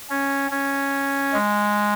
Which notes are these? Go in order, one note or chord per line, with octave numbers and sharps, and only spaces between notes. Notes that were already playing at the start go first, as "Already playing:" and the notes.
C#4
C#4
G#3